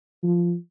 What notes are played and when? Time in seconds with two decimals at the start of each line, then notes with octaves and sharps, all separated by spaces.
0.23 F3